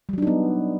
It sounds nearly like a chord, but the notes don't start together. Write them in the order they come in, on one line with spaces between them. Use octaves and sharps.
G3 F#3 D4 D#4 B3